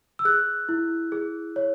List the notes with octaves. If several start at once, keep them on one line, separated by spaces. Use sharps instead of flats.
E6
G#4 F#6
E4
G#4
C#5